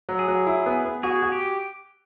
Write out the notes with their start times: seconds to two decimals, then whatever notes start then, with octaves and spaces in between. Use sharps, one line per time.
0.09 F#3
0.19 G#4
0.28 F#3
0.47 E4
0.66 B3
0.85 B3
1.03 F#4 G#4
1.22 F#4
1.32 G4